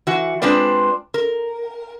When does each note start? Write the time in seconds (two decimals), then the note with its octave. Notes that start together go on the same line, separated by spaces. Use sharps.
0.07 E3 F#4
0.42 G#3 C4 D4 F4 B4 D5
1.14 A#4